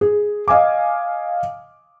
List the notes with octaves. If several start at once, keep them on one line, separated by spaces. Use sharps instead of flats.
G#4
D#5 F5 G#5 D6